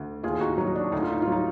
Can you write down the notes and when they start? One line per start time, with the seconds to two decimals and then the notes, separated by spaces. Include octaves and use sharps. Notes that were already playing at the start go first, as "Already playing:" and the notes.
Already playing: D2
0.23 D#2 F4 G#4
0.40 D#4 F#4
0.58 F#3 D#4
0.76 D4
0.92 D2 D#4
1.02 F4
1.13 D#4
1.22 F4
1.27 F#3 D#4